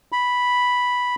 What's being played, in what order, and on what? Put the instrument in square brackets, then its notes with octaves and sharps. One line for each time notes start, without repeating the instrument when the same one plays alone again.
[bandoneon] B5